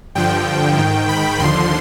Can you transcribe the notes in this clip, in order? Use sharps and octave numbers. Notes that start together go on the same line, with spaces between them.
G2 D3 F3 G5
G#2 D#3
B5
D#2 D3 F3 C6